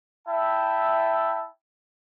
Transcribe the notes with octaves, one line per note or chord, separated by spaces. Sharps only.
E4 E5 G5 A5